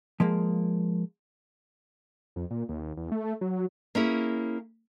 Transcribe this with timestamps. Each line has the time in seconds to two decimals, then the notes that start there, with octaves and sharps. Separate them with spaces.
0.20 F3 G#3 A#3
2.36 F2
2.51 A#2
2.69 D#2
2.97 E2
3.12 A3
3.41 F#3
3.95 A#3 C#4 E4 G#4